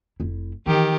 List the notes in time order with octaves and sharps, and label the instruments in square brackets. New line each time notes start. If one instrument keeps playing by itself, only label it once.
[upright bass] F1 E4
[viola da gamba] D#3 G4 [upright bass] E3